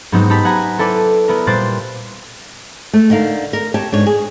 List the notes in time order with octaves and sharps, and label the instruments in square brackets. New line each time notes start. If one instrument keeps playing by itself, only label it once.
[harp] G#2 F#3 B3 C4 D#4
D#4 G4 A5 B5
F#5 G#5 A#5
C4 E4 A4 B4 D5
B3 E4 A#4
A#2 G3 C5 F#6 A6 D7
[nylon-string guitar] A3
D3 D#4 A#4 F5
A#4
G4 C#5 A5
G#2 D4 C#5
G#4